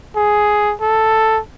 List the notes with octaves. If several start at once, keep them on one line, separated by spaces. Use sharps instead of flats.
G#4
A4